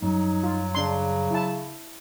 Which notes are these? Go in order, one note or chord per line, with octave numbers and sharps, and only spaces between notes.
F#2 F#3 G3 D#4
F4
C#3 D4 C6
E4 A5